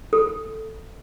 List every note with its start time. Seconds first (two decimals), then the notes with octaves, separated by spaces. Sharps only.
0.13 A4